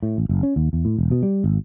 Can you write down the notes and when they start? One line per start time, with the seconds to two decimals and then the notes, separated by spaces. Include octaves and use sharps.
0.03 A2
0.18 A1
0.29 F#1
0.43 C#4
0.56 D#2
0.73 E2
0.85 A2
0.98 E1
1.11 B2
1.23 G3
1.44 G#1